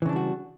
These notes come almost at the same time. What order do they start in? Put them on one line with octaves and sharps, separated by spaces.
E3 C#3 D4 G3 F#4